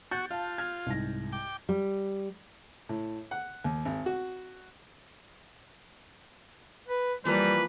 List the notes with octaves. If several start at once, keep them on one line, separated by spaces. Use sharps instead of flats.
F#4 C#6 F#6 G6 A6
F4 F5 A5
F6 G#6
C2 G#2 A#6
G5 D6
G3
A2
F#5
D#2
G#1
F#4
B4
E3 F3 G3 A#3 B4